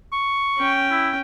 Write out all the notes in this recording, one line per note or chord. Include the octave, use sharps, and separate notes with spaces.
C#6
C#4 G5
E4